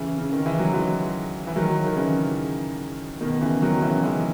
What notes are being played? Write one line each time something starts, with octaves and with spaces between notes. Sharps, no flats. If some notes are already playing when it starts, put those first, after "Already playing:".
Already playing: C#3 E3
C#3
D#3
E3
F#3
E3 G#3
E3
D#3 F#3
D#3
C#3 E3
B2 D#3
C#3 E3
D#3 F#3
C#3 E3
E3 G#3